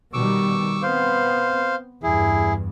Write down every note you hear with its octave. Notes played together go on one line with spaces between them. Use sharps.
B2 D#3 G3 C#6 D6 E6
B3 C4 C5 F5
E2 G2 E4 G#4